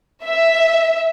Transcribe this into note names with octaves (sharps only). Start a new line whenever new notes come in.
E5